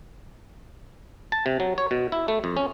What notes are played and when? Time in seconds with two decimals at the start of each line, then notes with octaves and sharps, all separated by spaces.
1.32 A5
1.46 C3
1.60 F#3
1.78 C#5
1.91 B2
2.12 E4
2.28 A3
2.44 F2
2.57 C#4